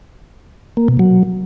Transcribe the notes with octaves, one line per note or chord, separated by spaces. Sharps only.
A#3
B2
F#3